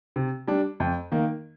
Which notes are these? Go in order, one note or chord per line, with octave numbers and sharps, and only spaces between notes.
C3
G3 D4
F2
D#3 A#3